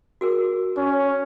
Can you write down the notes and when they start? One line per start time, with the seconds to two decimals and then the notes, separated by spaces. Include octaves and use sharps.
0.21 F#4 G#4 A#4
0.77 C#4